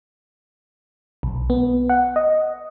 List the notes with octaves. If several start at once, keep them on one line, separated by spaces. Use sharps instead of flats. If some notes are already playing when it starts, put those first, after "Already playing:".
B1
B3
F#5
D#5